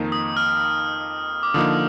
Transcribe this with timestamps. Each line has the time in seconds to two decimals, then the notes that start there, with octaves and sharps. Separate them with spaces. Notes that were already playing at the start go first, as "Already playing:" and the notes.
Already playing: F2 D#3 A#3 D#4
0.12 D#6
0.37 F6
1.43 D6
1.54 D3 F3 A#3 D#4 D#6